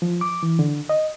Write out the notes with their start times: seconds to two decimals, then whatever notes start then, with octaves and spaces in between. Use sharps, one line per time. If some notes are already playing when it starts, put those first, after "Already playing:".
0.02 F3
0.21 D6
0.43 E3
0.59 D3
0.89 D#5